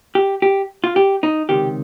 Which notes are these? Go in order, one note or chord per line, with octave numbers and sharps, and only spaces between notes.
G4
G4
F4
G4
D#4
C#2 C3 D#3 G4